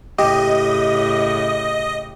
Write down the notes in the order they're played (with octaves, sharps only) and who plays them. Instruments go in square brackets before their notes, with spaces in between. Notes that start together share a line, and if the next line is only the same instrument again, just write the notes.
[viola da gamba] A2 C#3 [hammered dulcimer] G4 [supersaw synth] D#5